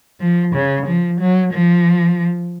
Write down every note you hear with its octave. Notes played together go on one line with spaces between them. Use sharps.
F3
C#3
F3
F#3
F3